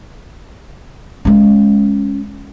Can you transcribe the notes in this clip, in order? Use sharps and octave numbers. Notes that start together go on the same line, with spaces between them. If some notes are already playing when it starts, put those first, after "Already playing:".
G#3 C#4